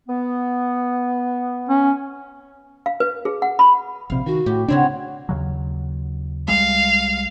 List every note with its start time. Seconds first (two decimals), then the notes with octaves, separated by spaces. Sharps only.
0.08 B3
1.69 C#4
2.86 F5
3.00 B4
3.25 G#4
3.42 F#5
3.59 B5
4.10 A#1 C3 F5
4.26 D#3 F#4
4.46 A2 G4
4.68 C#3 C4 D4 E4 F#4 C#5
5.29 D#2 C#3 F#3
6.48 C2 G3 G#3 F5